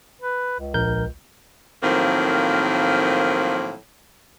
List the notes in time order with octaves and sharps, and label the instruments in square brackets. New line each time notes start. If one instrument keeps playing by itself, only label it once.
[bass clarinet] B4
C#2
[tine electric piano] A#1 A#4 G6
[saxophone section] A2 D#3 F3 F#3 A#3 C4